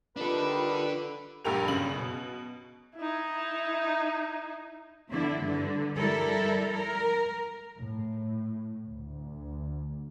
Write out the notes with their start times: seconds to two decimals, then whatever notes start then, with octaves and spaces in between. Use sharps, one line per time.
0.17 D3 D#3 G3 D4 F4 A4 B4
1.45 A#1 G2 G4 A#4 F7
1.68 F#2 C#3 F#7
1.95 B2
2.96 D#4 E4
5.10 D3 E4
5.41 G2 D3
5.96 G3 E4 A4 A#4
6.72 A#4
7.80 A2
8.88 D2